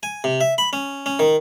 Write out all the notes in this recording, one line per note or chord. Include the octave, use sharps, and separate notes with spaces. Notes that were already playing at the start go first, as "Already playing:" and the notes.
G#5
C3
E5
B5
C#4
C#4
D#3